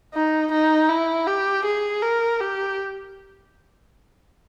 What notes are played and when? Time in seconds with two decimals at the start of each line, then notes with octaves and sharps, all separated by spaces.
0.14 D#4
0.51 D#4
0.89 E4
1.27 G4
1.65 G#4
2.02 A#4
2.40 G4